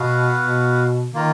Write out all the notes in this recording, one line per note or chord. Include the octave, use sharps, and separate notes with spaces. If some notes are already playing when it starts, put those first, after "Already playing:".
Already playing: B2 B3 F#4 B4 F5
B2
D#3 A#3 F4 A#4